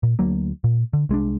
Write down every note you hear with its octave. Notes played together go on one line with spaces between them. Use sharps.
A#2
D2 F#3 A#3
A#2
D3
C2 G#3 C#4 D4